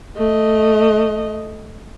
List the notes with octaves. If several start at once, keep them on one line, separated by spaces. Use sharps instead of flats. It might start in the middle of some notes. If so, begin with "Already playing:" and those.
A3 D#5